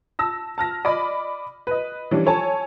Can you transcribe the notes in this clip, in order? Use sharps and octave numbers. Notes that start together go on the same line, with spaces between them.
A5 E6 A#6
A5 F6 A#6
D5 D#5 B5
B4 D#5
E3 F3 G3 C#4 D4
A4 C#5 G#5 A5